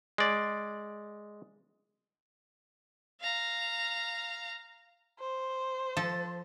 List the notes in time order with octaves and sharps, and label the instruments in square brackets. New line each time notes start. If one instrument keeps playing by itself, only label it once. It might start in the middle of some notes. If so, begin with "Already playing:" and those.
[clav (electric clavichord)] G#3 D5
[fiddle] F5 A#5
[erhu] C5
[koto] F3 A4 A5